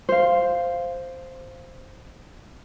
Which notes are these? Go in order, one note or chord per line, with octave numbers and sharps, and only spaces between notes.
C5 F5